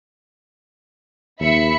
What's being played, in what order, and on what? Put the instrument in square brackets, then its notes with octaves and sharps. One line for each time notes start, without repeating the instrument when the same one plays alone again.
[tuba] D#2 [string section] E5 B5 C#7